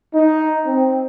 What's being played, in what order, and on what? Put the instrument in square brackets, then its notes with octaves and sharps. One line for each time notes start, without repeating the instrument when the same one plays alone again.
[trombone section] D#4
C4